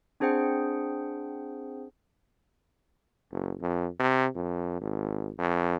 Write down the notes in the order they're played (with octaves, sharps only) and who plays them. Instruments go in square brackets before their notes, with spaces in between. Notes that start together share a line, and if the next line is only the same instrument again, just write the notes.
[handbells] C4 D4 G#4 C5 F#5 G5
[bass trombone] F#1
F2
C3
F2
G#1
F2